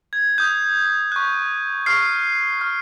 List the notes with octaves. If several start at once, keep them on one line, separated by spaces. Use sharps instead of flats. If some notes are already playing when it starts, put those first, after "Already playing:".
G#6
D#6 G6
C#6 F#6
C#6 F6 C7
C#6 F6